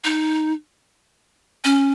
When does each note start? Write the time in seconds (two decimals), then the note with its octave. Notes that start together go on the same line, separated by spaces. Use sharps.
0.04 D#4
1.64 C#4